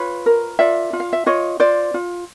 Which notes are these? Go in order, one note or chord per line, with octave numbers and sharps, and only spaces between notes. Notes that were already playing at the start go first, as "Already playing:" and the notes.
Already playing: F4 B4 C#5
A#4
F4 D5 E5
F4
F5
E5
F4 C#5 D#5
F4 C5 D5
F4